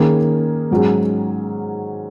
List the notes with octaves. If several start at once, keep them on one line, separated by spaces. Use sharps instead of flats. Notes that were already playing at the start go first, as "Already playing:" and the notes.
Already playing: D#3 A#3 C#4 G#4
G#2 F#3 C#4 G#4